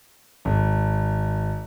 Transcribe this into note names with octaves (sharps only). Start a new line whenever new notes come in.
G#1